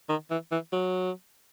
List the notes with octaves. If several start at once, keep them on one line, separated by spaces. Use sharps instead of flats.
D#3
E3
E3
F#3